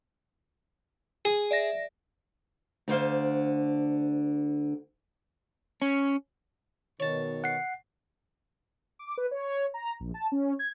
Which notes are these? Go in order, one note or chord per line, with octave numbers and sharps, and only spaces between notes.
G#4
D5 E5 A#6
D2 D3 C5 F5
C#4
B2 D#3 C#5 A5
F#5 C7
D6
B4
C#5
A#5
A#1
A5
C#4
G#6